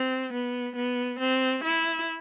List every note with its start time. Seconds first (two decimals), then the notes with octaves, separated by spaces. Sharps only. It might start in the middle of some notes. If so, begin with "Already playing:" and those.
Already playing: C4
0.32 B3
0.75 B3
1.19 C4
1.63 E4